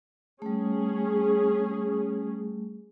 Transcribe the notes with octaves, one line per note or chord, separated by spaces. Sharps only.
G3 A3 C#4 G#4